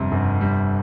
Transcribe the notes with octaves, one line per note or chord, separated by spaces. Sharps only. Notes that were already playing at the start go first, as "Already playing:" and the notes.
Already playing: G1 F2 C3 G3
G1
G3